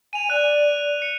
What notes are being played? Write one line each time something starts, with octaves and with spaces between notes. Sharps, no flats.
G#5 D#7 F7
D5 F#6 D#7
C#7